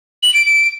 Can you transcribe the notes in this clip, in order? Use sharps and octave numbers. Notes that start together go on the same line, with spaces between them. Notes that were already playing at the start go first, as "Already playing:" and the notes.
F#7
D7
D7